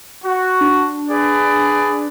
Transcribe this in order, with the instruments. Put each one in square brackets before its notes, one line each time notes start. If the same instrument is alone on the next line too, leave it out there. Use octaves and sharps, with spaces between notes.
[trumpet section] F#4
[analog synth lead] D4
[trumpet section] G#4 B4 D5